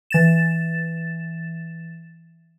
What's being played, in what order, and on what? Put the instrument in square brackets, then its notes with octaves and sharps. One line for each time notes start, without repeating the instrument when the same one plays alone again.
[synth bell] E3 A6 E7